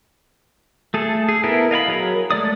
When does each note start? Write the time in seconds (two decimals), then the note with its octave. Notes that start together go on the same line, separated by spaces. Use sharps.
0.94 A3 G#4 A4
1.29 G#4
1.44 B3 E4 A4 A#4
1.71 D#5 F5 G#5 B5
1.88 F#3 G#4 A#4
2.31 G#3 A3 D5 D#6